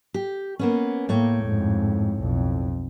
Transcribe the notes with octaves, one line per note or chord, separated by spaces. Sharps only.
G4
A#3 B3 C#4
A2 A#3 C#5 G5
F2 G#2
B1 F2